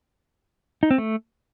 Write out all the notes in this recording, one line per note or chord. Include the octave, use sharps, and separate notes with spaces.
D#4
C4
A3